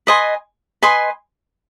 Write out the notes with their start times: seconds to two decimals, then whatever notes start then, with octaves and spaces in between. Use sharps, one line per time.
0.07 B4 D#5 G#5 C6
0.82 B4 D#5 G#5 C6